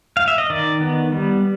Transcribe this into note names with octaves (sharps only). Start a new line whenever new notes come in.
F5
E5
D#5
D#3 D5
B3
G3